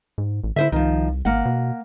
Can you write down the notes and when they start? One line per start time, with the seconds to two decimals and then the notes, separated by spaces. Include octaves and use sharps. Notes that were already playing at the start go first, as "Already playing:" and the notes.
0.18 G#2
0.44 A1
0.56 D3 E4 C5 E5
0.72 C2 D#3 F3
1.25 G#1 A#3 F#5
1.45 B2